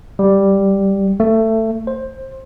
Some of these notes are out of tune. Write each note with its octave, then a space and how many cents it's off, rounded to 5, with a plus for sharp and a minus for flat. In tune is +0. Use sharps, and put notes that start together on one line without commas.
G3 +0
A3 +20
C5 +15